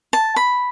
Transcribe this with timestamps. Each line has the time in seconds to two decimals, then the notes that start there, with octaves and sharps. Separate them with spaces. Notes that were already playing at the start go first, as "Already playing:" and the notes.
0.13 A5
0.36 B5